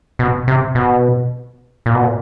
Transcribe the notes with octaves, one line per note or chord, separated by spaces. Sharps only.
B2
C3
B2
A#2
B2
A#2